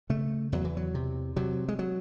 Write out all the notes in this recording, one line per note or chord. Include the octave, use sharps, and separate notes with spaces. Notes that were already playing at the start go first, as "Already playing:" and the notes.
C#3 A3
E2 F#3
E3
F#3
C3
C3 F#3
G#3
F#3